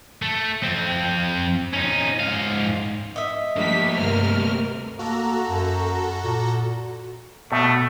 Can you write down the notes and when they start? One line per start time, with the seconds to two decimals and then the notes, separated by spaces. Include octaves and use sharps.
0.22 A3
0.63 F2 C4
1.74 C#4 D#4
2.20 G#2 F5
3.16 D#5 E5
3.56 F3 G3 A3 A#3 D4 B6
3.97 D2 G2 C3 A#4 F6
4.99 A#3 F#4 A4 A#5
5.48 F#2
6.24 A#2
7.52 B2 A3